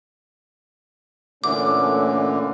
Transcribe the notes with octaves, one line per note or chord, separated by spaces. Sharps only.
A#2 D3 E3 A3 C#4 D6